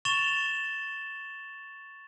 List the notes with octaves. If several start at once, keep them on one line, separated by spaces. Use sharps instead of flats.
C#6 A6 E7 F7 G7